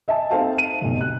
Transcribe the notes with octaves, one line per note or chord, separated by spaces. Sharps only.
D#5 E5 G#5 A5
C4 D#4 A4 C5 F5 A5
D#7
F1 B1
F#6